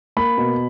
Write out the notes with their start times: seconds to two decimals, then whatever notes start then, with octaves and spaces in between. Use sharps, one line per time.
0.17 A#3 B5
0.38 B2